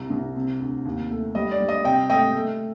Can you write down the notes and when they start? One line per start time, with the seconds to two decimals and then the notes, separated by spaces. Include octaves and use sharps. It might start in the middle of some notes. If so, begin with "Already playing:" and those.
Already playing: C2 A#5
0.10 C2
0.36 C3
0.60 D2
0.85 D#2
1.10 A3
1.35 G3 D#5
1.51 D5
1.60 G3
1.68 D#5
1.84 C3 D#5 G5
2.09 A3 D#5 G5
2.34 A3